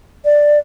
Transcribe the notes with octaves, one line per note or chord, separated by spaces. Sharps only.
D5